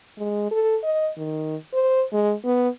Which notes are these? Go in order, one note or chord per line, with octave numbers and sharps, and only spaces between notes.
G#3
A4
D#5
D#3
C5
G#3
B3